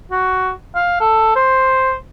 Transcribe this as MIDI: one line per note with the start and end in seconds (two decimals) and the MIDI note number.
0.11 0.51 66
0.75 0.96 77
1.00 1.36 69
1.36 1.96 72